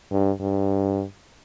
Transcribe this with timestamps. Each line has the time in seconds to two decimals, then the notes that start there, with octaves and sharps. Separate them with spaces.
0.11 G2
0.40 G2